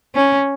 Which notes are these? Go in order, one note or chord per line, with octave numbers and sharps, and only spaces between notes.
C#4